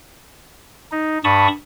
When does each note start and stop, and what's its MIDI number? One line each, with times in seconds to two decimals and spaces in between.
0.92 1.18 63
1.24 1.48 43
1.24 1.48 81
1.24 1.48 83
1.24 1.48 85
1.24 1.48 87